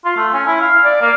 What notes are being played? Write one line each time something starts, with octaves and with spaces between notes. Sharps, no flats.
F4
A3
C#4
E4
F5
D5
A#3